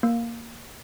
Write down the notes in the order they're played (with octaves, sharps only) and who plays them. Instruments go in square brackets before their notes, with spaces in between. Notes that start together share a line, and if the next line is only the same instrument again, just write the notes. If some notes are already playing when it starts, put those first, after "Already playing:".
[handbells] A#3